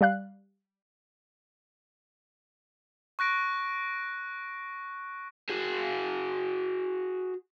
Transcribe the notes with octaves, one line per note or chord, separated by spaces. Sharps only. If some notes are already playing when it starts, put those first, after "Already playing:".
G3 D5 F5 F#6
C#6 F#6 A#6 D7
F#4 G#4